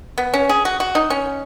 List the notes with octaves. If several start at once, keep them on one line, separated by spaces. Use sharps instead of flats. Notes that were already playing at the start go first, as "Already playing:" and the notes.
B3
C#4
G#4
F#4
F#4
D#4
C#4